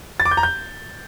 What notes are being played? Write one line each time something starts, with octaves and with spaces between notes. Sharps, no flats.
A6
D6
G6
A#5
G6